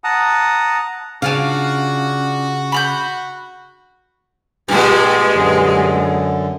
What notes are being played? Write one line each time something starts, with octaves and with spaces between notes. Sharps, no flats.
F#5 A5 A#5 D#6
C#3 D4 F4 F#4 F5
B5 F6 G6
G2 A#2 G#3
F#2 D3